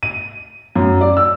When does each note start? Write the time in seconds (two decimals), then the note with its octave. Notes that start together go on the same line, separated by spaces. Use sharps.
0.03 D#7
0.75 F#2
1.01 D5
1.17 E6